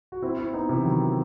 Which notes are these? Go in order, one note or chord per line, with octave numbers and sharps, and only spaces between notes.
F#4
C4 E4
C4 E4
B3 D#4
C3 E3
D#3 F#3